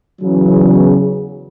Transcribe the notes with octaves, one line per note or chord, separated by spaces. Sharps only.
E2 C#3 F#3